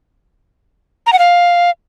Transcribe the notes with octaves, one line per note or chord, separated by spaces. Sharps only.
A#5
F#5
F5